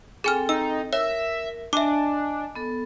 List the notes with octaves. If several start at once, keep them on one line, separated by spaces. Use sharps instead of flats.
C4 G#4 A4 G5 G#5 F6
D#4 E6
A#4 C#5 E5
D4 D#5 E5 G#5 A5 D6
B3 A4